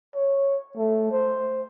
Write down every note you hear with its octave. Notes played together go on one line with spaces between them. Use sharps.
C#5
A3
C5